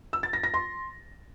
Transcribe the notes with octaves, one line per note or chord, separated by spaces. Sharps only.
E6
A6
A#6
A#6
C6